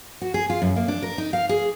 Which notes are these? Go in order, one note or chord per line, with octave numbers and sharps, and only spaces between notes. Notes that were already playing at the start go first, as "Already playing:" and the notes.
F#4
G#4
F4
F#2
A#3
D4
A#4
D#4
F5
G#4